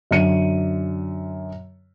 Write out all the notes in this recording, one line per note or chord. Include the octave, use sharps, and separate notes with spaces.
F#2 D3 C#7 D#7